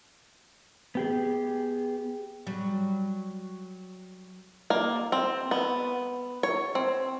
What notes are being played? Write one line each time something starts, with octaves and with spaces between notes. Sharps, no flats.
B3 G4 G#4
F#3 G3
A#3
C4
B3
C#5
C4